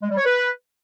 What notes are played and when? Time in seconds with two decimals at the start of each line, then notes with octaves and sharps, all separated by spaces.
0.02 G#3
0.10 G3
0.17 C#5
0.25 B4